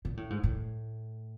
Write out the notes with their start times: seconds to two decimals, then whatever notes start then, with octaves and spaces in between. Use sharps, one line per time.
0.05 A#2
0.17 A2
0.30 G#2
0.43 A2